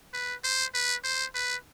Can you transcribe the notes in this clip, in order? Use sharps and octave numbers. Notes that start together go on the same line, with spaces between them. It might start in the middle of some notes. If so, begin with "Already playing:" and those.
B4
C5
B4
C5
B4